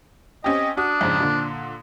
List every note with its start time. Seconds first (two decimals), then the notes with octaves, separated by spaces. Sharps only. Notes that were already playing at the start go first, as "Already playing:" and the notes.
0.44 C4 C#4 G4 D#5
0.77 D4 F#4 D#6
1.01 F2 G#2 C#3
1.20 A#2 D3